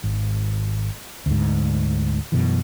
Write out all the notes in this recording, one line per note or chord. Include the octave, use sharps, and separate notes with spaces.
G#1
D2 G#2
F#2 B2 E3